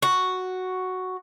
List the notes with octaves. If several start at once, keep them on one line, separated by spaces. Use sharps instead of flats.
F#4